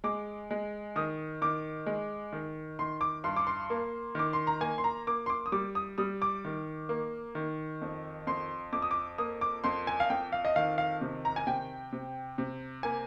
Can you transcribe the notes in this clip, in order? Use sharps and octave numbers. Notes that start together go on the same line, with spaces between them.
G#3 D6
G#3
D#3 D#6
D#3 D6
G#3
D#3
D#3 C6
D6
G2 C6
D6
C6
A#3
D#3 D6
C6
A#5
A#3 G#5
C6
A#5
A#3 D6
C6
D6
D#6
G3 D6
D#6
G3 D#6
D6
D#3
A#3
D#3
F2
F2 C6
F2 D6
D#6
D6
A#3 D#6
D6
F2 C6
G#5
F5
F2 G5
F5
D#5
D#3 F5
F5
C3
A#5
G#5
C3 G5
C3
C3
A#3 G#5